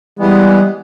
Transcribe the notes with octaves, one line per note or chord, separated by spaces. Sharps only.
E3 G3 G#3 B3